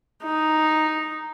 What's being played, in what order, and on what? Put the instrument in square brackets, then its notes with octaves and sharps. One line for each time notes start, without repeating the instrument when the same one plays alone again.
[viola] D#4